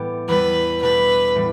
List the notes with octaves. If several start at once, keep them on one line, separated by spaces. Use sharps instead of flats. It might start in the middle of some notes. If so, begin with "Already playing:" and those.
Already playing: A2 E3 G3 B3 G4
E2 E3 G3 B3 B4
B2 A3 D4 G4 B4
A2 E3 G3